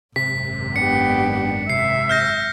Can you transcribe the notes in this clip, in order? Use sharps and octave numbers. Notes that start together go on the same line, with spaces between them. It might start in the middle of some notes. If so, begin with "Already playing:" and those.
G#1 F#2 C3 B6
B3 D4 G4 C#7
C3 E5 C7
F6 G6 A#6